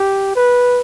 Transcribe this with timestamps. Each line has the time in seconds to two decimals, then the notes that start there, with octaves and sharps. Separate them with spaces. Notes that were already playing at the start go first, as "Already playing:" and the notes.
Already playing: G4
0.36 B4